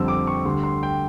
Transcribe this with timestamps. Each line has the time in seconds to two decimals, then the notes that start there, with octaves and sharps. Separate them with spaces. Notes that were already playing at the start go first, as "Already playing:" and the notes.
Already playing: F2 D3 G3 C4 E6
0.08 D6
0.27 C#6
0.45 D2 D3 G3 C6
0.63 C6
0.83 G5